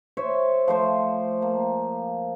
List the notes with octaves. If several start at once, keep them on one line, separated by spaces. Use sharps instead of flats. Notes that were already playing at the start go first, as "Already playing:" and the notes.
C5 C#5 E5
F3 A3 C5
A#3